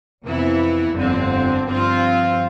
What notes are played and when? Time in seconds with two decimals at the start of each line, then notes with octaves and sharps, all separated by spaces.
0.25 F2 C3 E3 B3 E4
0.95 G1 F2 D3 F3 C4
1.66 G2 F3 C4 F4